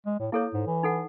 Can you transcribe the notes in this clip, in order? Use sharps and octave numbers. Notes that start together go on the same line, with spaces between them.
G#3
A2
A#3 E4 A4 C#5
G#2
E3
D#4 A4 F#5